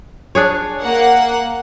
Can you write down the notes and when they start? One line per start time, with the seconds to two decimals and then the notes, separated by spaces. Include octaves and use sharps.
0.35 D4 G#4 C#5
0.83 A#3 F#5